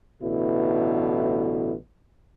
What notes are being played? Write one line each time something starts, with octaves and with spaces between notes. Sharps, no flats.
A1 B2 D3 E4